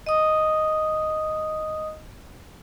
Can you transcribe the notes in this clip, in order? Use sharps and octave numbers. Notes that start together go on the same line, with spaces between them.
D#5 D#6